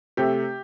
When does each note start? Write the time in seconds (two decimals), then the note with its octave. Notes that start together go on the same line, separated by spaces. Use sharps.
0.17 C3 A3 C4 G4